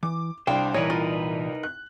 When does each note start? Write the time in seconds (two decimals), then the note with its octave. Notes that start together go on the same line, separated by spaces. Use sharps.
0.03 E3 D6
0.47 C2 G3 D4 C5 F5 G5
0.74 A#2 E3 D#4 A#4 B4 C#5
0.90 F4
1.63 F#6